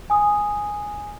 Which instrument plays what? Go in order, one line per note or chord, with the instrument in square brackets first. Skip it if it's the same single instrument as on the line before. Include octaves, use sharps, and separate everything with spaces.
[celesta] G#5 D#6